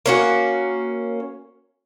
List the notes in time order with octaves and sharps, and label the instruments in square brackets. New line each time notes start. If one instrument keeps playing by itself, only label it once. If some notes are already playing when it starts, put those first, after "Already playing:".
[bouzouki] A#3 C#4 F#4